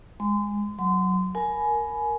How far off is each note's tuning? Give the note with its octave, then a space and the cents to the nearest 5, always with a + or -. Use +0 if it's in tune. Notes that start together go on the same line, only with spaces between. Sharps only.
G#3 -15 C6 -35
F#3 +0 C6 -30
A#4 +0 G#5 +20 B5 +0